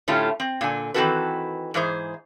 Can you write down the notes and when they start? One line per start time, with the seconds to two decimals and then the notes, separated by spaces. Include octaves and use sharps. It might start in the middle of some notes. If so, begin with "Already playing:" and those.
0.08 A2 D3 A3 C#4 F4 G4
0.40 C4
0.61 A#2 D3 G#5
0.94 D#3 E3 C4 F#4 A4 B4
1.74 G#2 E3 G#4 C5